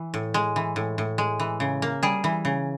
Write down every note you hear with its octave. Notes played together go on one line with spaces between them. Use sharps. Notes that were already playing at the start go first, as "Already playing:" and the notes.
Already playing: E3
A2
G#3
E3
A2
A2
G#3
E3
C#3
A#3
G3 G#4
E3
C#3